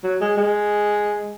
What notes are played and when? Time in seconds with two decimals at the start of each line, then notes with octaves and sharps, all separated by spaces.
0.04 F#3
0.21 G#3
0.37 G#3